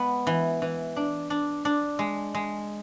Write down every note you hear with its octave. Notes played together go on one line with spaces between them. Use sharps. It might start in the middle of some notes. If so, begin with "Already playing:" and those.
Already playing: G#3 B3
E3
E3
D4
D4
D4
G#3
G#3